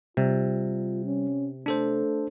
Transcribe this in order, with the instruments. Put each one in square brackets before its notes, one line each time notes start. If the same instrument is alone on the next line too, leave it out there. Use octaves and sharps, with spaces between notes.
[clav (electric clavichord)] C3 [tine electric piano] G3 [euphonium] F4
[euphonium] C#4
[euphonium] A3 [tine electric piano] D4 A4 C5